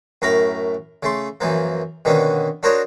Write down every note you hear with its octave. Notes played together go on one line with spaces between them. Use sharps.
F#2 A2 A#4 F5 A#5 B5
C#3 A3 C6
F#2 E3 F3 A#3
B2 D3 D#3 A#3 C#4
D4 F#4 A#4 C5 C#5 D#5